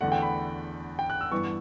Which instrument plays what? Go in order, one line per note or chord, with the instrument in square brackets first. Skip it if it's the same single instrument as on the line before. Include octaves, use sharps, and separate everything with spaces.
[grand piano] E2 D3 A3 F#5
G5
B5
G5
F#6
E6
G2 E3 B3 C#6